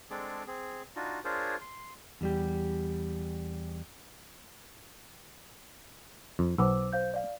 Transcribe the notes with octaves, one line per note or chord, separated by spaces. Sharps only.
G#3 C4 D4 G#4 A4 D6
C4 G#4
D4 D#4 F4 F#4
D4 F4 G#4 A#4 C5 C#5
C6
E2 G3 G4
F2
B1 B3 C5 D6 E6
C5 F5 G6
D5 F5